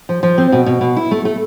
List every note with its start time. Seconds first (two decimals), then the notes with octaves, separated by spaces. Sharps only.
0.09 F3
0.23 F3
0.38 C4
0.52 B2
0.66 B2
0.81 B2
0.97 E4
1.11 A3
1.25 A3